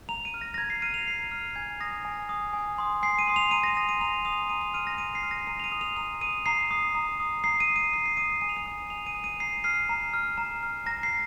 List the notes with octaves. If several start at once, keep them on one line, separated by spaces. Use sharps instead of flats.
A#5 F7
D#7
F6
A#6
A#6
A#5 G#6
C7
F6 D#7
F7
A#5 C7
F6
G#5 G#6
D#6 A#6
G#5
D#6
G#5
C6 D#6
G#5 C7
D#7
C6 D#6
F7
A#5 D#7
A#6
D#6 A#6
D#7
A#5 F7
D#6 F7
A#5 D#7
F7
F6 D#7
A#6
A#5 D#7
C7
F6
A#6
A#5 D#7
F7
D#7
D#6
F7
A#5 F7
D#6 D#7
A#5 C7
D#6
A#5
D#6
A#5 C7
D#7
D#6
D#7
A#5 C7
C7
D#6 D#7
C7
G#5 D#7
F7
D#7
D#6
G#5 F7
D#7
D#6
D#7
A#5 C7
F6 C7
A#5
F6
A#5
F6
A#5 A#6
C7